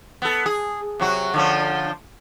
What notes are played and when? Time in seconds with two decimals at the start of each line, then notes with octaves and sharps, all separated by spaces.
0.22 B3 A4
0.46 G#4
1.00 C3 F#3 F#4
1.34 D3 F3 C#4